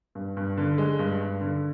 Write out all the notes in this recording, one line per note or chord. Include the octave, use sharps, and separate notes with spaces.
G2
G2
D3
G#3
G2
G2
D3